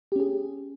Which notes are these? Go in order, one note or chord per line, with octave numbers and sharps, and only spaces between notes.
C#4 G4 G#4